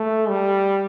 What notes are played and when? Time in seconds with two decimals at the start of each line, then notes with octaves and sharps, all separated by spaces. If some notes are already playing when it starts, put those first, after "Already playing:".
Already playing: A3
0.29 G3